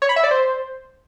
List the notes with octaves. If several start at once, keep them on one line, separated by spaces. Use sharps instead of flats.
C#5
B5
E5
D5
C5